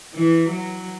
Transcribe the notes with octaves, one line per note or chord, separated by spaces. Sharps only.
E3
F#3